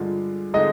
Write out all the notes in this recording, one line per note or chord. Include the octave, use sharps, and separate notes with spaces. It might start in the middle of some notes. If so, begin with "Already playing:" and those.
Already playing: G2 D3 G#3 F4
D3 G#3 D#4 D#5